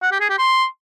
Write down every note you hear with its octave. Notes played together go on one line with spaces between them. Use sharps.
F#5
G4
G#4
G4
C6